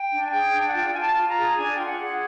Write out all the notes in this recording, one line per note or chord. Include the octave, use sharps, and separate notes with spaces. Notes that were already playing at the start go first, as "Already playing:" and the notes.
Already playing: G5
D4
G#5
G#4 G5
D4
F#5
F4 G5
F4 G#5
A5
F4
A#5
G#4
D4 G#5
G5
F4
F#5
G#4